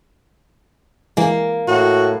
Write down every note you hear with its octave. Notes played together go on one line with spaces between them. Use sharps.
E3 G#3 A#3
A2 F#4